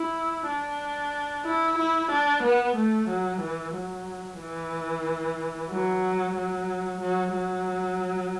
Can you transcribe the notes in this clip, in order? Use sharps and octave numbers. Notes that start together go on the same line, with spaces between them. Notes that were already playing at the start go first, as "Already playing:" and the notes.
Already playing: E4
D4
E4
E4
D4
B3
A3
F#3
E3
F#3
E3
F#3
F#3
F#3
F#3